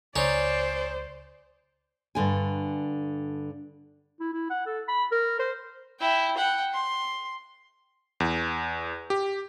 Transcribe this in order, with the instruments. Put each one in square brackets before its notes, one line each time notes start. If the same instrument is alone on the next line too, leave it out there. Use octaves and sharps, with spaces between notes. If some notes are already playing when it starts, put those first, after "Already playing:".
[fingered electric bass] C#2 C#3 [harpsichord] C#4 D#4 [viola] C5 [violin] D5
[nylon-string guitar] G2 D3 G#5
[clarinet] E4
E4
F#5
A4
B5
A#4
C5
[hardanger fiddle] E4 G5
F#5 G5
C6
[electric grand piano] E2
G4